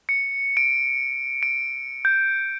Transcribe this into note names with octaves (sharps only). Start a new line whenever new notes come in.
C#7
D7
D7
G6